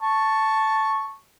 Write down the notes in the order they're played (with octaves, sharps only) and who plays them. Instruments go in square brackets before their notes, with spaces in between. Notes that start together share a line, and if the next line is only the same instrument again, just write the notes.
[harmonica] A5 C#6